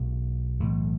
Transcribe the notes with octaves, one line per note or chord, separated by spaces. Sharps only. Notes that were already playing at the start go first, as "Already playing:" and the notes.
Already playing: B1 B2 G#3
B1 A2 E3 A3